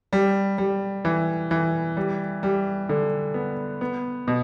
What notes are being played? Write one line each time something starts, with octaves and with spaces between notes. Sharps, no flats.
G3
G3
E3
E3
G3
G3
D3
B3
B3
B2